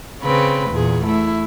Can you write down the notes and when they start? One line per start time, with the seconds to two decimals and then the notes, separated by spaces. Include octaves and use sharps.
0.22 C#3 C4 B4
0.71 E2 A#2 G#4
1.04 A3 E4